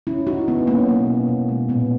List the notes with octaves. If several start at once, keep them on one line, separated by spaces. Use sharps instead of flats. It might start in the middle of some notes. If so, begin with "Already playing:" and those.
C#3 C#4 E4
C#3 D#4 F#4
C#3 B3 D#4
F#3 A#3 C#4
B2 A#3
B2
B2
G#3
A#2 B3